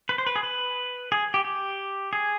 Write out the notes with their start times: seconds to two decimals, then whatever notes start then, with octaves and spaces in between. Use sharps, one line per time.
0.09 B4
0.18 C5
0.27 B4
0.36 G#4
0.43 B4
1.12 G#4
1.34 G4
1.45 G4
2.13 G#4